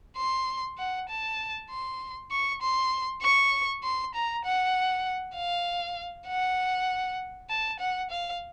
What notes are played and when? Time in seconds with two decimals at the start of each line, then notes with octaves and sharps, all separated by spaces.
0.17 C6
0.78 F#5
1.09 A5
1.70 C6
2.31 C#6
2.62 C6
3.22 C#6
3.83 C6
4.14 A#5
4.45 F#5
5.35 F5
6.27 F#5
7.50 A5
7.80 F#5
8.11 F5